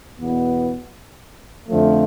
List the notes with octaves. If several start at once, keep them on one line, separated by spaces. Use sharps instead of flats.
E2 B2 B3
F2 D3 F3 A3